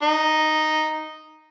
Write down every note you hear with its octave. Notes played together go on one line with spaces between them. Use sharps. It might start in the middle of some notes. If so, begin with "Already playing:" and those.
D#4